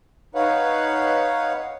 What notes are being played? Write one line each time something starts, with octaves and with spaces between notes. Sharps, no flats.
D#4 B4 C#5 F5 F#5